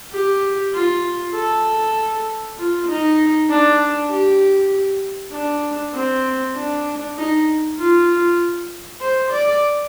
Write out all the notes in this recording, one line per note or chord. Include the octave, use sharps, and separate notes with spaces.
G4
F4
A4
F4
D#4
D4
G4
D4
C4
D4
D#4
F4
C5
D5